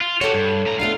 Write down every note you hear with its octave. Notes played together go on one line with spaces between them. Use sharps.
F4
F#4 G4 A4 C#5
G2
A2 A#5
A3 B3 D4 F4 F5